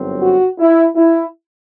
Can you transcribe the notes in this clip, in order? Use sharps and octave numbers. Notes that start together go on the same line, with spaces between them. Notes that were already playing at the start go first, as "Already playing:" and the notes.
Already playing: G1 F#2 F#3 C4
F#4
E4
E4